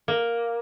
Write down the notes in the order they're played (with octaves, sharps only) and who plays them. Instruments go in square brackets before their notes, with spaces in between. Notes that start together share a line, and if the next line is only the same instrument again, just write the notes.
[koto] A#3